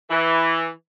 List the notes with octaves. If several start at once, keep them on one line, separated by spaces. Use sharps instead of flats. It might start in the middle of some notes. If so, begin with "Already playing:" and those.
E3